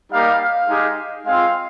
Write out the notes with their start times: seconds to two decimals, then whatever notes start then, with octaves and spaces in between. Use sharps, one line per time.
0.12 G3 A#3 D#4 G4 F5
0.40 F5
0.69 G#3 D#4 G4
1.26 G#3 C4 F4 F5